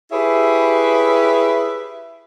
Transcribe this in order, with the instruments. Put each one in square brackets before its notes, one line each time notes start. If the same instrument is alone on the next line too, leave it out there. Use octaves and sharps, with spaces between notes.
[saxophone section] E4 G4 G#4 B4 C#5 E5